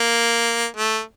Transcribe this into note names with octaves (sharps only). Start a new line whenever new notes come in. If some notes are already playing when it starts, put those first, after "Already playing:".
Already playing: A#3
A3